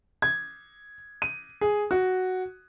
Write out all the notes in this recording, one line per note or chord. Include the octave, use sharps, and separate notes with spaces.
G#6
D#7
G#4
F#4